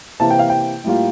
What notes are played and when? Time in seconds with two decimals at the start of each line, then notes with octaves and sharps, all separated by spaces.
0.20 C3 E3 A#3 E4 A5
0.30 G5
0.39 F5
0.50 G5
0.84 A2 G3 A#3 F4